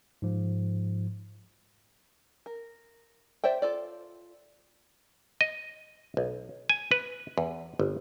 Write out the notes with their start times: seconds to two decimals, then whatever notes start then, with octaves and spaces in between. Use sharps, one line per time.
0.22 G#2 F3
2.46 A#4
3.44 C5 D5 E5 G5
3.62 F4 A4 D5
5.41 D#5
6.17 B1
6.69 G#5
6.91 B4
7.38 E2
7.80 G1